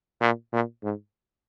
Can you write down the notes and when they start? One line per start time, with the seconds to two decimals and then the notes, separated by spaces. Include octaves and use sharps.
0.21 A#2
0.52 A#2
0.83 G#2